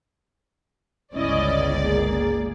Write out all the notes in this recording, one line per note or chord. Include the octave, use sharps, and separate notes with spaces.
G1 C#2 C#4 E4 D5 D#5
A#3 G#4